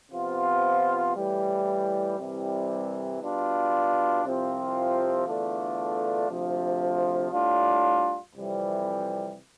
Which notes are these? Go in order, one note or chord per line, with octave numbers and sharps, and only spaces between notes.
C3 F3 B3 F4
A2 E3 G3
C2 C3 E3 G3
B2 G3 D4 F4
C2 C3 F3 C4 F4
E2 D3 A3 D4 F4
D2 C3 F3
A2 G3 D4 F4
F2 C3 E3 G3